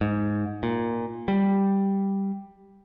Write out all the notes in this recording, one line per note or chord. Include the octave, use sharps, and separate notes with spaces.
G#2
A#2
G3